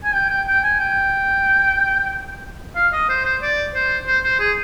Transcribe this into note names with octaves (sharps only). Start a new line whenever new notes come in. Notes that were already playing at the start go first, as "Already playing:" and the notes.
G#5
G5
G5
G5
G#5
G5
F5
D#5
C5
C5
D5
C5
C5
C5
G#4